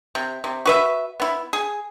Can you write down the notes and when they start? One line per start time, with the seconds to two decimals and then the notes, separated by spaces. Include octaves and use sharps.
0.15 C3
0.44 C3
0.65 F#4 B4 E5
1.20 B3 E4
1.53 G#4